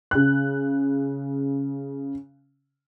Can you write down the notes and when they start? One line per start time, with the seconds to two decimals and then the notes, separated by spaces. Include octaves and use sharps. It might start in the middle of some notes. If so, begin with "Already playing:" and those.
0.11 C#3 F#6